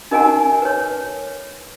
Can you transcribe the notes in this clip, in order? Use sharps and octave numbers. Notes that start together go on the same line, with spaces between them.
D#4 A#4 D#5 F#5 G#5 A5
B4 C#5